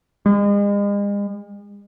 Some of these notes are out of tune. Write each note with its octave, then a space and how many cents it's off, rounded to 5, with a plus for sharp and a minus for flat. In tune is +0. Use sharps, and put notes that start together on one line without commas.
G#3 -40